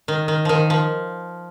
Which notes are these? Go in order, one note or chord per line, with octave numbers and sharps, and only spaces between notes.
D#3
D#3
D#3 F3
F3